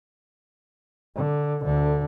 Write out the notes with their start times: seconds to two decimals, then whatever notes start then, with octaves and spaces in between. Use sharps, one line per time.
1.16 D3
1.64 D2 D3